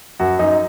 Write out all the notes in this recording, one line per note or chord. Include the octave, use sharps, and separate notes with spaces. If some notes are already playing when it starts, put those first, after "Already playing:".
F#2 F#4
F#2 D#4